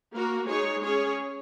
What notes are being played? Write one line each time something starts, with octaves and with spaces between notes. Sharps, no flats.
A#3 F#4 A#4
G#3 D#4 G#4 C#5
C#4 G#4 C#5